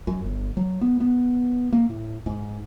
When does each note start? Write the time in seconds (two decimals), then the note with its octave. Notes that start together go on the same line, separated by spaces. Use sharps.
0.07 F#2
0.24 G1
0.57 F#3
0.81 B3
1.00 B3
1.72 A#3
1.89 A2
2.26 G#2